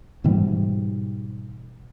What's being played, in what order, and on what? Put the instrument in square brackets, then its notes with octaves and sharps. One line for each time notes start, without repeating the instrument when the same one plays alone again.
[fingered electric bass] G#2 B2 E3 G3